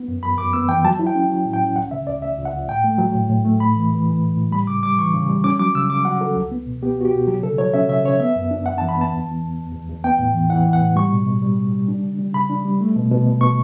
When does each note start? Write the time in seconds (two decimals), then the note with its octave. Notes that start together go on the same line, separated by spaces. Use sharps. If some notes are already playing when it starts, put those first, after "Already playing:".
Already playing: B3
0.08 F#2
0.23 F#2 B5
0.38 F#2 D6
0.53 B3 E6
0.68 E3 G5
0.85 F#3 A5
0.99 E4
1.07 G5
1.15 C#4
1.30 F#3
1.45 A2
1.53 G5
1.62 C#4
1.76 C#2 F#5
1.91 C#3 E5
2.07 C#2 D5
2.22 C#2 E5
2.38 C#2
2.45 F#5
2.53 C#2
2.68 A2 G5
2.84 A3
2.98 F#3
3.15 A2
3.30 A2
3.45 A3
3.60 A2 B5
3.76 E3
3.91 E3
4.06 E3
4.21 A2
4.37 A2
4.52 G3 B5
4.67 C#3 D6
4.83 G3 D6
4.98 E3 C#6
5.14 C#3
5.29 G3
5.44 C#4 D6
5.59 F#3 D6
5.75 C#3 E6
5.90 C#3 D6
6.05 F#3 F#5
6.20 F#3 A4
6.36 C#2
6.52 B3
6.67 B2
6.83 B3 G4
6.98 B3 F#4
7.05 G4
7.13 B2
7.28 F#3 G4
7.43 C#3 A4
7.58 F#3 C#5
7.74 C#4 E5
7.89 C#3 E5
8.04 C#3 C#5
8.20 B3 E5
8.36 F#2
8.51 D4
8.66 F#2 F#5
8.78 A5
8.82 E3
8.89 B5
8.97 B3 A5
9.12 E2
9.27 E3
9.42 E2
9.58 E2
9.73 E2
9.89 E2
10.04 B3 G5
10.19 A2
10.34 E3
10.50 E3 F#5
10.65 E3
10.73 F#5
10.81 A2
10.96 G3 C#6
11.12 B2
11.26 B2
11.42 G3
11.57 B2
11.73 G3
11.88 D4
12.03 C#3
12.19 G3
12.34 C#3 B5
12.50 D4
12.65 G3
12.81 A3
12.96 B2
13.11 B2
13.27 B2
13.41 B2 C#6